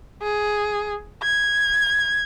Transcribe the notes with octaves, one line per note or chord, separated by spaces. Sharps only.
G#4
G#6